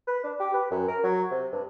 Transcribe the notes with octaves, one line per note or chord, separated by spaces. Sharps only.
B4
D4
G4
B4
F#2
A#4
F#3
C3
G2